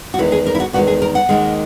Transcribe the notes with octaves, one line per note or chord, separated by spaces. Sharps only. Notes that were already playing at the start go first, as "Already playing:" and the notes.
F#4
E2 D#3 G#3 E4
G#4
A#4
E4
F#4
E2 D#3 G#3 F#4
G#4
A#4
F#5
D#2 D#3 G#3